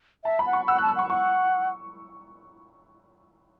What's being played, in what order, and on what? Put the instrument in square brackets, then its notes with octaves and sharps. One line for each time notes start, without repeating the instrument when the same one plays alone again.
[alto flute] E5 [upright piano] A5
[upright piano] B5
[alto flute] F#5
[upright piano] C#6
[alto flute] F#5 [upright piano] E6
[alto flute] A5 [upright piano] F#6
[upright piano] E6
[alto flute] F#5 [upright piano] C#6
[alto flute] F#5 [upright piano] C#6